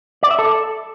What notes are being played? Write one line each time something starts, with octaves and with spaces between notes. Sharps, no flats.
D5
E5
A4